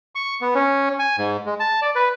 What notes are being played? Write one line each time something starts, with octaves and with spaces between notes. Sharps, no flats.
C#6
B3
C#4
G#5
G#2
G#3
A5
D5
B4